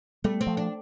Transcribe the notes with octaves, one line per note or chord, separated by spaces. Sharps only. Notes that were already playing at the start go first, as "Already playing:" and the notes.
G3 A3 B3
C4
F3 A3
D4